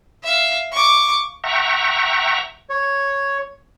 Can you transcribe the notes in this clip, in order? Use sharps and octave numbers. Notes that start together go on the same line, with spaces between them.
E5 F5
C#6 D6
E5 F#5 G5 A#5 C#6
C#5